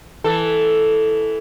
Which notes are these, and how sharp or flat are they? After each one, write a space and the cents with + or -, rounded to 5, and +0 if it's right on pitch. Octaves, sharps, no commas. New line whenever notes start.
E3 +0 A4 +0